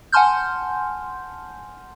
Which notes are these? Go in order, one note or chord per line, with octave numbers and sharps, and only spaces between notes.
F#5 G#5 A5 C6 F6 G6